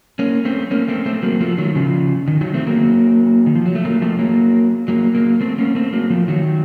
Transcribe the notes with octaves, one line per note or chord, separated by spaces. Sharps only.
A#3 C#4
A3 C4
A#3 C#4
A3 C4
A3 C4
F#3 A#3
F3 A3
D#3 F#3
C#3 F3
D#3
D#3 F#3
A3 C4
F#3 A#3
D#3
F3
F#3
A3
F#3 A#3
F3 A3
F#3 A#3
F#3 A#3
F#3 A#3
A3 C4
A#3 C#4
A3 C4
F#3 A#3
F3 A3
D#3 F#3